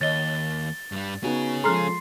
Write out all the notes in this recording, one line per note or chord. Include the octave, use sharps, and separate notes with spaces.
D#2 C#5 D#5 A6 G7
G2 G3
B3 C#4 D#4 F#4 G#4
F3 G#3 A4 A#5 C6 F6 F#6 C7